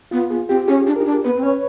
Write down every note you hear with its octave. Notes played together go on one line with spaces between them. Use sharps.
B3 F4
B3 G#4
C4 G4
C#4 G#4
D4
D#4 A#4
D4
B3 B4
C4
C#4 C#5